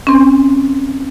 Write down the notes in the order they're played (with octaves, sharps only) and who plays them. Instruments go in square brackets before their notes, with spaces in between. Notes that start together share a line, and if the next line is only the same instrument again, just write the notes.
[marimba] C4 C#4